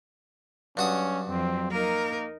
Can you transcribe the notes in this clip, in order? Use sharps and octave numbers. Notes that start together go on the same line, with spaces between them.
G2 F#3 C#4 F#4 D#6
F2 C4
A#3 D#4 A#4